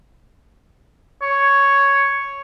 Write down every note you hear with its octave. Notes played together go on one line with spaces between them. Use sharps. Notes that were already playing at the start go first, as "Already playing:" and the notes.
C#5